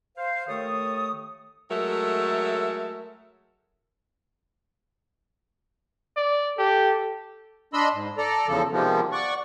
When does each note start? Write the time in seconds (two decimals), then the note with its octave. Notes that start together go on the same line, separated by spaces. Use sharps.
0.16 C5 F5
0.47 D#2 D#3 A3 A4 C#5 D#6
1.71 F#3 G#3 A3 A4 A#4 E5
6.17 D5
6.58 G4 A4
7.74 D4 D#5 B5 C6 E6
7.93 G#2
8.18 A4 D5 A#5
8.47 E2 C#3 F3 A4
8.72 C3 D#3 F3 G3 G#3 B3
9.12 D5 F#5 C#6